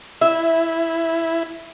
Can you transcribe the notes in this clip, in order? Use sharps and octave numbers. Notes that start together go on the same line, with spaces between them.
E4 E5